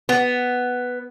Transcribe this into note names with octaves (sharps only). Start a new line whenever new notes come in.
B3